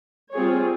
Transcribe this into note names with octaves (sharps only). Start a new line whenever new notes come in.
G3 C4 F4 G#4 C#5